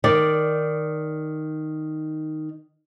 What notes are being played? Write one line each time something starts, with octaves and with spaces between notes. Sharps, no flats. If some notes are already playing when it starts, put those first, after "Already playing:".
D#3 D5